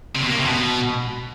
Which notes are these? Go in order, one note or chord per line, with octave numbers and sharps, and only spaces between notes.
C3
B2
A#3
C3
B2